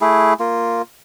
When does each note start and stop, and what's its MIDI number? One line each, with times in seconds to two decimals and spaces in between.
0.01 0.33 57
0.01 0.33 64
0.01 0.33 68
0.40 0.82 58
0.40 0.82 65